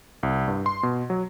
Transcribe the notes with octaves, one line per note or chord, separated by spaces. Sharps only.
C2
G2
C6
B2
F#3